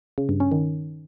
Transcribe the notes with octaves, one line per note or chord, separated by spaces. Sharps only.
C#3
G2
C#4
D#3